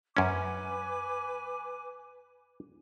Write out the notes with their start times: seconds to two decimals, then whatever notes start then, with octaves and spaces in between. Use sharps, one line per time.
0.17 F#2 C#4 B4 G#5 D6